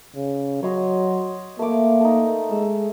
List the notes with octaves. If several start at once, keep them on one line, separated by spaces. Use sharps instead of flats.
C#3
F#3 C#5 D#5 C6
A3 A#3 D6
D#4 A4
G#3 E6